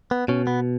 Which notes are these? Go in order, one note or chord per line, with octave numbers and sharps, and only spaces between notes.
B3
B2 C#4
B3